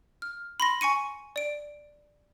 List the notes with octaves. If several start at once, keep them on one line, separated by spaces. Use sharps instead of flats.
F6
B5 C6 A#6
G#5 C#6 C#7 D#7
D5 D7